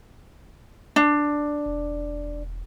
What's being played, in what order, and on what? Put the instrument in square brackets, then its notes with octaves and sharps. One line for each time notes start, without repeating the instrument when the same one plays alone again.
[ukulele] D4
[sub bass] E1